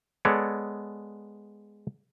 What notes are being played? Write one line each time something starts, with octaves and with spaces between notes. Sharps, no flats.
G#3 B3 A4 C#5 D5